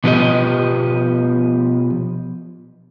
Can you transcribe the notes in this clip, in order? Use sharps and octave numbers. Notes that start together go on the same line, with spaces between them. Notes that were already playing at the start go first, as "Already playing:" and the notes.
B2 F3 B3 D#4 G4 D#5